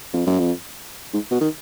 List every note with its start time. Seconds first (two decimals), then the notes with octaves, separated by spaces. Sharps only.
0.13 F2
0.26 F#2
0.39 F2
1.14 G#2
1.31 B2
1.40 D#3